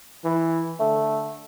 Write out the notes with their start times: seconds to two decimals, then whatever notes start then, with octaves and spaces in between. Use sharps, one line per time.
0.24 E3
0.80 D3 A3